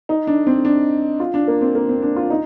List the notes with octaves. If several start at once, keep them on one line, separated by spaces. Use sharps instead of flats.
D#4
D4
C4
D4
F4
D4
A#3
C4
A#3
C4
D4
F4
D#4